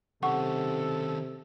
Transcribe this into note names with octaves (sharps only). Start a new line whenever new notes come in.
C3 D#3 C#4 A4 F#5 C#6